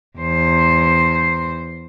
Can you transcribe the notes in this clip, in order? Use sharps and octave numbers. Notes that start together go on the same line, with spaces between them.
E2 C5